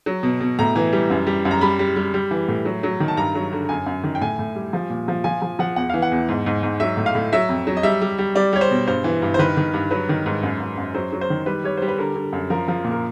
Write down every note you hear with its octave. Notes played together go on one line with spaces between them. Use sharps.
F#3
B2
B2
A2 A#5
E3
G3
F#2
G3
F#2
A#5
G3 B5
G3
G3
G3
E3
A2
F#3
F#3
D#3
A5
G2 A#5
F#3
D3
F#2 G#5
F#2
D#3
G5
A2 G#5
A2
G3
F3
A#2
F3
F3 G#5
F3
F3 F#5
E2 F#5
E3 F5
F#5
E2
G#2
G#2
G#2
F#3 E5
A2
F5
A2
F#3 E5
F2
F#3
D#5
G3 E5
G3
G3
G3 D5
G3 C#5
C5
B2
G2 C5
E3
G2
C5
D#3 B4
D#3
G2
F#3 B4
D#3
G#2
F#2
F#2
F#2
F#3 C5
F#3
C5
D#3
G3 B4
G3 C#5
G3 C5
B4
D3 A#4
D3
F#2
F3 A#4
F3
A#2
A#4